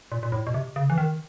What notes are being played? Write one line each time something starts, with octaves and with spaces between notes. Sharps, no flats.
A#2
A#2
A2
B2
C3
C#3
E3
D#3